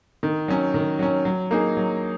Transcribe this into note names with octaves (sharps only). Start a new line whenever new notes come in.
D#3
F#3 C#4
D#3
F#3 C#4
F#3
A#3 D#4 G#4
F#3